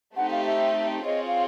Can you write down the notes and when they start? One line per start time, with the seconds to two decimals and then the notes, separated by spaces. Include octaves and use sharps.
0.17 A3 C4 D#4 G4 F#5
0.31 F5
0.46 E5
1.05 C4 F4 G#4 C#5 D#5
1.27 F5